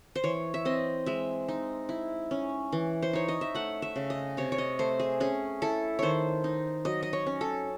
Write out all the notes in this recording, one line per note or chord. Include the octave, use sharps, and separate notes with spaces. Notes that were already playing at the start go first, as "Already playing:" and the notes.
C5
E3 C#5
E5
C4 D#5
G#3 E5
D#4
E4
C#4
E3
C5
D#4 C#5
D#5
E5
A3 F#5
E5
C#3
D#5
C3 C#5
C#5
D#5
A3 C5
G#4
C#4 G#4
E4 A4
D#3 C5 C#5
D#4
F#3 D#5
D#5
C#5
C#4
A4